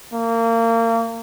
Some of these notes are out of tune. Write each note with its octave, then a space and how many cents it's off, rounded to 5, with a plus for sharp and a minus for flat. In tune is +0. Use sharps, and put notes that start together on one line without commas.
A#3 -30